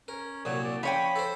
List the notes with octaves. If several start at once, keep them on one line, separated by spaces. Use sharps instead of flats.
C#4 A#4
C2 A#2 F#3 C#5
D5
F3 C#4 C#5 G5 B5
A4 C5